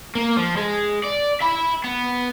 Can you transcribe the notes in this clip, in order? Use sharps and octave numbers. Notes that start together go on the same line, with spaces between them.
A#3
F3
G#3
D5
E5 B5
B3